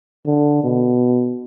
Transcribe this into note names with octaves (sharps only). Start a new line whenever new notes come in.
D3
B2